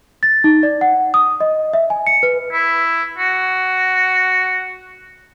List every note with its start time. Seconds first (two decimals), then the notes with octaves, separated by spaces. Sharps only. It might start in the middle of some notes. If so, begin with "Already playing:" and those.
0.23 A6
0.44 D#4
0.63 D5
0.81 F#5
1.14 D#6
1.40 D#5
1.73 E5
1.90 G#5
2.07 C#7
2.23 B4
2.52 E4
3.18 F#4